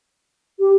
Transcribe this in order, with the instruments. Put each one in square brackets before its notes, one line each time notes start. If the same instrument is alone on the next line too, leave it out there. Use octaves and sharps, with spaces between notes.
[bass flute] G4